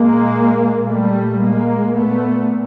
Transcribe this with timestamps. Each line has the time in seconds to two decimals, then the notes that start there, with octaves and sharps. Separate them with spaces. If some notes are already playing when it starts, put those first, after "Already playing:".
Already playing: A#2 G#3 A#3
0.89 A#2 G3 A3
1.42 G#3 A#3
1.95 A#2 A3 B3